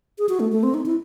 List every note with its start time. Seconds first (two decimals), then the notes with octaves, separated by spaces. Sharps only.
0.18 G#4
0.29 F#4
0.40 A3
0.52 A3
0.63 C4
0.74 D#4
0.86 E4